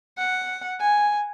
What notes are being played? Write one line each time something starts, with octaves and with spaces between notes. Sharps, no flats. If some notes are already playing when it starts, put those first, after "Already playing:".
F#5
G#5